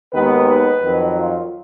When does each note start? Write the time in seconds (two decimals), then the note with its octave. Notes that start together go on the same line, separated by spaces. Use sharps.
0.13 D#2 D#3 G#3 B3 B4
0.47 B4
0.81 F2 D#3 F#3
1.15 F4